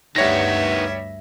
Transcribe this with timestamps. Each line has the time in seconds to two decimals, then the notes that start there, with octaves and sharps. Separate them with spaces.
0.16 D2 G2 D#3 G3 B3 C#5 E5 A#6